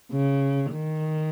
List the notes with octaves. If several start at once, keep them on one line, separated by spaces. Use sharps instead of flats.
C#3
D#3